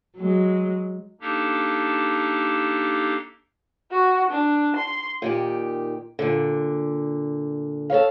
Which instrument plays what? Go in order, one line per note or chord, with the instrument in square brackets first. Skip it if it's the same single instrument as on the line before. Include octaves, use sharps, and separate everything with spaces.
[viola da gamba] F#3 G#3
[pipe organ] A#3 D4 D#4 G4 A4
[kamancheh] F#4
D4
C6
[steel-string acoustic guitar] A#2 D#3 G4
A#2 D3
A4 A#4 C#5 F5